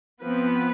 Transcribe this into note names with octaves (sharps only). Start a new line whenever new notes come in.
F3 B3 C4 B4